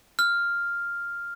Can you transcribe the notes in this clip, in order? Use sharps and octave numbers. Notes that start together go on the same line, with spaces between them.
F6